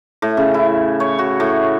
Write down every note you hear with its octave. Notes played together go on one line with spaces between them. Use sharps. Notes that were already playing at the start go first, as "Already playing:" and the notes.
A2
C#3
E4
C#5
F#4
A2